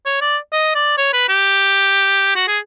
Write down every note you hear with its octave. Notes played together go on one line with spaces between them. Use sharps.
C#5
D5
D#5
D5
C#5
B4
G4
F#4
G#4